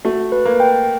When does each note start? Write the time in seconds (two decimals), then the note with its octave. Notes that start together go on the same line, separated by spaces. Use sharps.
0.05 A3 F#4
0.32 B4
0.45 A#3
0.60 G5